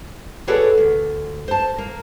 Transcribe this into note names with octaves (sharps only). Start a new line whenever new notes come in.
F#4 G#4 A4 B4 C#5 D5
D2
C5 A5
A#3